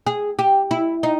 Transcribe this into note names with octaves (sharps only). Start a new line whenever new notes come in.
G#4
G4
E4
D#4